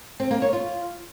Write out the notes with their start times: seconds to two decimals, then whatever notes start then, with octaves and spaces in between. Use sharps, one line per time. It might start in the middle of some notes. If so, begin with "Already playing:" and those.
0.20 C4
0.31 A#3
0.42 C#5
0.53 F4